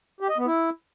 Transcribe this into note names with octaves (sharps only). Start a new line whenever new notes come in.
G4
D#5
B3
E4